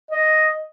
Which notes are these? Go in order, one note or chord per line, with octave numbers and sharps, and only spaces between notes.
D#5